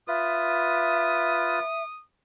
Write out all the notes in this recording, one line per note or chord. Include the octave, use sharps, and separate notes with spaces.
F4 B4 E5 D#6